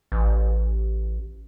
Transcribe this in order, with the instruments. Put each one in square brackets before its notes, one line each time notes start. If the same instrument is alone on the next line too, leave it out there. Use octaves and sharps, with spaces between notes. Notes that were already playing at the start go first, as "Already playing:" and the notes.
[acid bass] A1